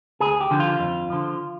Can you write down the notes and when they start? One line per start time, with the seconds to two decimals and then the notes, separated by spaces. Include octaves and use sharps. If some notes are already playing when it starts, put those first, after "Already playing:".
0.20 D2 G#4
0.41 G4
0.51 D3 F3
0.60 F4
0.80 F2
1.10 D3 F3